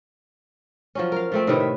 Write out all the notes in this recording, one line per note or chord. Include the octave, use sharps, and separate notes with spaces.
F3 F#3 C#4
A#4 F5
F3 A3 C4
A2 C3 D#3 B4
E5